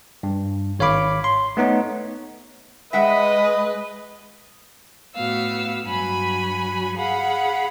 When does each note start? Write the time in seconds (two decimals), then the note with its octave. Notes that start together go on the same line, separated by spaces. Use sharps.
0.23 G2
0.79 G#1 C#5 F5 B5 D6
1.24 C6
1.57 A3 B3 D#4 C#5
2.93 G#3 B4 D#5 E5 F#5 G5
5.14 A2 B3 F#4 F5 E6
5.84 G2 F#3 F#4 G#5 B5
6.96 G#4 F5 F#5 B5